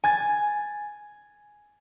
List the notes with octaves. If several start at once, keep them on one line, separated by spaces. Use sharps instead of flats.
G#5 G#6 A6